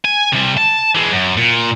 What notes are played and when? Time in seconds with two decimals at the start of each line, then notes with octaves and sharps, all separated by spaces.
0.05 G#5
0.33 C3 G3
0.58 A5
0.95 E3 G#3
1.12 F#2
1.37 A#2